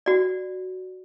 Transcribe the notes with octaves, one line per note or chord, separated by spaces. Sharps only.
F#4 D5